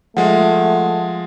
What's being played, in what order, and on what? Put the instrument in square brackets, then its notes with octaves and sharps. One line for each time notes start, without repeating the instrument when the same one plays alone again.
[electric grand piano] F3 G#3 [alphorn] A3 [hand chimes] F#5